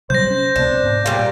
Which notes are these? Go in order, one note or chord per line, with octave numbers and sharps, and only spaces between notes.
C3 F#3 G3 C5 G6 A#6
C#4
C#2 C3 B3 D4
G#2
A#2 G3